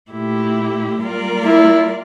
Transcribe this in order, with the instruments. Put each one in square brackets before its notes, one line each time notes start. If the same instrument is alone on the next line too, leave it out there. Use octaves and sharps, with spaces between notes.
[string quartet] A#2 A3 E4 G4
G3 A#3 F4 A#4 D5
[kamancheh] E4